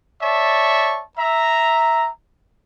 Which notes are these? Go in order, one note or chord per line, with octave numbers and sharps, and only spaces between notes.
C#5 D5 E5 A5 C#6
E5 A#5